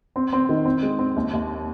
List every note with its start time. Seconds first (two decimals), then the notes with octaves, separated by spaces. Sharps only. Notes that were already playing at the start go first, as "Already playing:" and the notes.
0.16 C4
0.33 C4
0.49 D#3
0.65 C4
0.82 G#3
0.99 C4
1.16 D#2
1.33 D#2